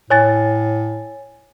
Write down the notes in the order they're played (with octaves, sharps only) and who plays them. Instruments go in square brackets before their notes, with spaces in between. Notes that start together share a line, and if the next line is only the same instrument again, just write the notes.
[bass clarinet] A2 [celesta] C#5 G#5 A6